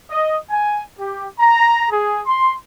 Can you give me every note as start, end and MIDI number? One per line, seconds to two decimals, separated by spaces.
0.11 0.37 75
0.51 0.81 80
0.99 1.27 67
1.40 1.86 82
1.91 2.20 68
2.26 2.54 84